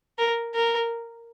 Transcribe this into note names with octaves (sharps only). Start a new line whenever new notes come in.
A#4
A#4